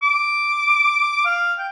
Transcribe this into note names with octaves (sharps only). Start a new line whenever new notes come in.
D6
F5
G5